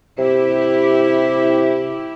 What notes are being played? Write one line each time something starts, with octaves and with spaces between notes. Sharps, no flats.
C3 E4 G4